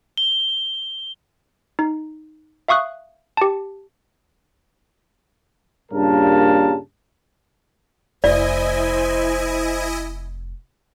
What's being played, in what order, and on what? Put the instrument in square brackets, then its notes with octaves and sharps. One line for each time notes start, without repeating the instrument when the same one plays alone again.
[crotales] G7
[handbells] D#4
E5 F5 C#6 D#6 F#6
G4 A5
[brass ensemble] G2 A#2 C#3 G3 A#4 A5
[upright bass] F1 [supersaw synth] E4 D#5 G#5 [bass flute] C5 [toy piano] D5